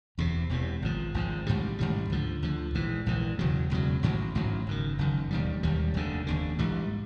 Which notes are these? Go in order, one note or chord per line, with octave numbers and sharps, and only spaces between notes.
E1 E2 C3
E1 E2 C3
G#1 G#2 F3
G#1 G#2 F3
A1 G#2 D#3 G3
A1 G#2 D#3 G3
D2 D3 F3
D2 D3 F3
A#1 G#2 E3
A#1 G#2 E3
E1 E2 C#3 F#3
E1 E2 C#3 F#3
A1 G#2 D#3 F#3
A1 G#2 D#3 F#3
F#1 F#2 D#3
F#1 F#2 D#3
E1 D#2 D#3 G3
E1 D#2 D#3 G3
F1 D#2 D3
F1 D#2 D3
A#1 G#2 E3 G3